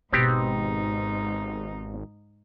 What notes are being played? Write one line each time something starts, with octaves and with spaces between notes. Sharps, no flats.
G#1 G#2 B2 B3 C4 D#4 F4 G4